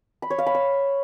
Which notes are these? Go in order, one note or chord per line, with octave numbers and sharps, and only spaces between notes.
B5
C#5
F5
B5
E6